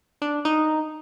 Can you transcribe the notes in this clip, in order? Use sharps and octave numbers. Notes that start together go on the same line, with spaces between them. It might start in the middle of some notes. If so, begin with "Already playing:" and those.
D4
D#4